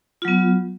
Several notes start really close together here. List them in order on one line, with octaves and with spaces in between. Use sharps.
F4 F#3 B3